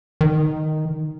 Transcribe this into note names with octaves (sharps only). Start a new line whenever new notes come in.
D#3